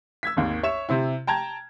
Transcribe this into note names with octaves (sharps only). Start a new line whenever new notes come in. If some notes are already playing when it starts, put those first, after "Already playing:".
E6 G#6 B6
G#1 D#2
C#5 E5 E7
C3 C4 E4
G5 A5 A#5 G#6